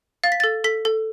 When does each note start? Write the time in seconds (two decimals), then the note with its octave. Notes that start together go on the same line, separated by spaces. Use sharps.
0.24 F5 A6
0.32 B6
0.40 A4 A6
0.64 A4 B6
0.85 A4